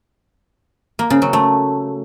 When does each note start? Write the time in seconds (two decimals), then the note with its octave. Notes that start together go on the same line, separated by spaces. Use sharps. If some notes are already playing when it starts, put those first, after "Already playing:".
0.99 A#3
1.10 C#3
1.22 F#3
1.33 A3